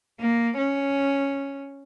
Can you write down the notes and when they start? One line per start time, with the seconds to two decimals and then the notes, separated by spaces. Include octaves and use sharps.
0.20 A#3
0.57 C#4